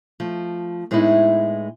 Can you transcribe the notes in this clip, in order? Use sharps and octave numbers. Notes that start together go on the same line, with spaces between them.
F3 A3
A2 G#3 A3 B3 D#4 E4